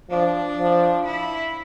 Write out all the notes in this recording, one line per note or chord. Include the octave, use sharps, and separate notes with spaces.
F3 D4
F3
E4